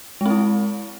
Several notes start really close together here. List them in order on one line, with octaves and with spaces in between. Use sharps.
G#3 C4 E4